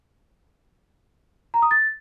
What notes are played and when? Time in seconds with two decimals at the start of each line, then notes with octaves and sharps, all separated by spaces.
1.54 A#5
1.62 D#6
1.71 A6